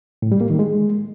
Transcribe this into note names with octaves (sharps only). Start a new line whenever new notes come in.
A2
G3
A#3
D#3
G#3